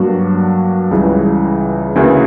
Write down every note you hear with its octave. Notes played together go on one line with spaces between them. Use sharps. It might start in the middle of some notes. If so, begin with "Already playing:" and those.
Already playing: G2 F#3 A#3 D4 F#4
C#2 C#3 E3 G3
D2 C#3 E3 A#3